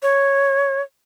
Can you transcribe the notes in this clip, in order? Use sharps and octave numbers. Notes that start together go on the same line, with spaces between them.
C#5